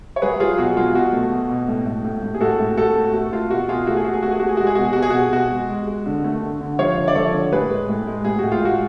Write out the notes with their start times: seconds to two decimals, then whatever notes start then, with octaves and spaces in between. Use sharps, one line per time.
0.16 C#5
0.22 F#3 G#4 B4
0.40 F#3 F4 G#4
0.58 B2 F#4
0.77 F#3 F4
0.95 B2 F#4
1.13 A3
1.32 B2
1.49 B2
1.68 A2
1.86 A2
2.04 A2
2.23 A2
2.34 G#4
2.41 A2 F#4 A4
2.60 A2
2.77 A2 F#4 A4
2.96 A3
3.13 A3 F#4
3.32 A3 F4
3.50 B2 F#4
3.69 B2 F4 G#4
3.87 A3 F#4
3.96 G#4
4.05 A3 F#4
4.13 G#4
4.23 A3 F#4
4.31 G#4
4.40 A3 F#4
4.49 G#4
4.57 G#3 F#4
4.67 G#4
4.75 B2 F#4
4.85 G#4
4.93 B2 F#4
5.02 G#4
5.10 B2 F#4
5.33 B2 F#4
5.51 G#3
5.69 G#3
5.87 G#3
6.06 D3
6.24 A3
6.42 D3
6.61 D3
6.79 F3 C#5 F5
6.98 D3
7.08 D5
7.15 F3 A4 C#5
7.34 D3
7.52 A2 G#4 B4
7.70 G#3
7.89 A2
8.07 G#3
8.25 A2 G#4
8.39 A2 F#4
8.52 F4
8.62 G#3 F#4